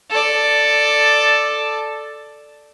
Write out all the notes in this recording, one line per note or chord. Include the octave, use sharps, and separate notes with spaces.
A4 D5